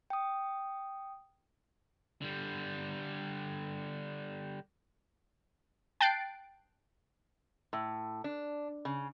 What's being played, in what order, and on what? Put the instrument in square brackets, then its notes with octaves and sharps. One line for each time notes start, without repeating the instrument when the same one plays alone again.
[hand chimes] G5 D#6
[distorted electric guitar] D3 G3
[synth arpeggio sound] G5 A5 F#6 A6 C7 D7
[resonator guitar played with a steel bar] A2
D4
C#3